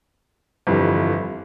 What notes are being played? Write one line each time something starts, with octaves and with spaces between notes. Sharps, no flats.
G1 F2 E3 G3